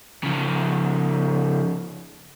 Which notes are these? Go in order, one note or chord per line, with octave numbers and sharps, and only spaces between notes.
C#3 F3